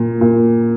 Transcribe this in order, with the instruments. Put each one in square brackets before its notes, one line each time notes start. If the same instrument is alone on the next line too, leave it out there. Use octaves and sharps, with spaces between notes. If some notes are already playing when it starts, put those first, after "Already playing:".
Already playing: [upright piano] A#2
A#2